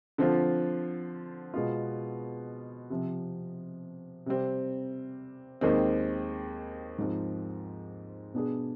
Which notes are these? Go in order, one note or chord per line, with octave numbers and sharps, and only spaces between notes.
D3 F3 C4 F4
B2 G#3 B3 F4
C3 F3 C4
C3 G3 C4
D#2 D#3 G#3 C4
G#2 F3 C4 F4
B2 B3 D4 G#4